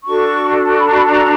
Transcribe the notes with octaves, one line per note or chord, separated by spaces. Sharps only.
D4 F#4 A4 C#6
B5
A#5
B5
A#5